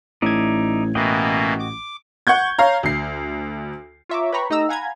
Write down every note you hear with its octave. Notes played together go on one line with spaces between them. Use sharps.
A1 A2 D#4 D5 E5 G#6
A1 B2 E3 A#3 F#4 D#5 G5
D6
F#5 C#6 G6 G#6
C#5 F5 A#5
D2 C7
F4 C#5 E5 A#5 C#6 D6
B4 C#5 G5 A#5 B5 C#6
A3 D#4 G4 D#5 A#5 E6
F5 F#5 G#5 A#5 B5 G#6